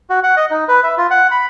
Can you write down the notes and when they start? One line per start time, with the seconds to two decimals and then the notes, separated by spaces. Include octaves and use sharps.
0.10 F#4
0.23 F#5
0.37 D#5
0.51 D#4
0.68 B4
0.84 E5
0.98 F4
1.11 F#5
1.31 B5